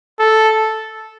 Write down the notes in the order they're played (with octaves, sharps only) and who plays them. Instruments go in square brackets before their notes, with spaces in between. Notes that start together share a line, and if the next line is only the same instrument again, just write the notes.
[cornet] A4